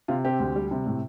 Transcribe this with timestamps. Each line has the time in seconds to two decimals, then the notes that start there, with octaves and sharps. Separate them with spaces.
0.08 C3 F4
0.25 C4 G4
0.39 D2
0.56 G3
0.71 C3
0.86 A2